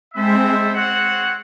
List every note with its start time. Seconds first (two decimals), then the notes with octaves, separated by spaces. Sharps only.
0.14 G#3 C4 E4 A4 C5 E5
0.74 C4 F#4 C#5 F#5